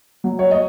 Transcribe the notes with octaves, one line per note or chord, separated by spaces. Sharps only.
F#3
C#5
D#5